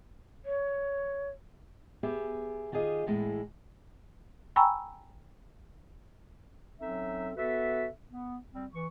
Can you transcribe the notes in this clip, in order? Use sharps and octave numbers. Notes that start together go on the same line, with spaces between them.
C#5
B3 G4 G#4 E5
D#3 F4 G4 G#4 D#5
E2 A2 G#3 E4
G5 G#5 A#5 B5 C#6 E6
F#3 C4 C#4 D#4 A4 E5
B3 F#4 A4 B4 E5
B3
G3 C4
E3 C#6